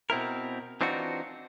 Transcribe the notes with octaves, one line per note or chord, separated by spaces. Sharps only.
B2 C4 E4 A#4
E3 C4 D4 D#4 F4 F#4